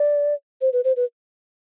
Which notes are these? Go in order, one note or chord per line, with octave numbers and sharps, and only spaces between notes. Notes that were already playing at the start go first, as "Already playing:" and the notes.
Already playing: D5
C5
B4
C5
B4